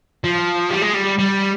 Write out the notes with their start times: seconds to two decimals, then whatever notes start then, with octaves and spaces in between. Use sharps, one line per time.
0.24 F3
0.70 G3
0.82 G#3
0.94 G3
1.18 G3